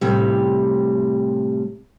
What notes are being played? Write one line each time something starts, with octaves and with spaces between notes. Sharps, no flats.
A2 C3 G3